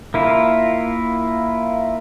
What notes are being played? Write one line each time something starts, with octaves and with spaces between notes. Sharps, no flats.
A#3 E4 F4